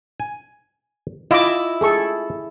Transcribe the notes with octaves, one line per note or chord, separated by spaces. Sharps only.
G#5
E4 F4 D#5 D6
G#4 A4 C#6